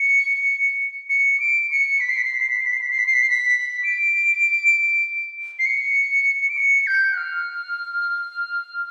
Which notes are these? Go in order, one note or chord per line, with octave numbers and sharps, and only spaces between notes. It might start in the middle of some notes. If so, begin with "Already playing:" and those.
Already playing: C#7
C#7
D7
C#7
B6
C7
B6
C7
B6
C7
B6
C7
B6
C7
B6
C7
B6
C7
B6
C7
B6
D7
C7
C#7
D7
C#7
G6
F#6
F6